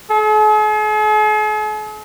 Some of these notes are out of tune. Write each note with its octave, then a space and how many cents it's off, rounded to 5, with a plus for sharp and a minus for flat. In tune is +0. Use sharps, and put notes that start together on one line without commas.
G#4 +45